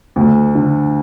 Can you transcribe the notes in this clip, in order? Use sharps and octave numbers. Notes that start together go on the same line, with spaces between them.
D2
D3